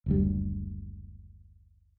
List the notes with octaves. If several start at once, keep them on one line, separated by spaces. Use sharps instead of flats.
F#1 D2 G3